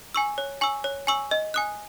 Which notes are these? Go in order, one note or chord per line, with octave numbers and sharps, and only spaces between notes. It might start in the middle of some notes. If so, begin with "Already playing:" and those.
G#5 C#6 E6
C#5
G#5 C#6 E6
C#5
G#5 C#6 E6
D#5
G#5 D#6 F#6